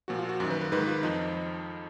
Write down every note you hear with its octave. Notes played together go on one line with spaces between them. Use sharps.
A#2 F3 F#4
F4
F#4
F#2 D#3
B4
B4
G#2 D#3 B4
F4
F2 F3 D#4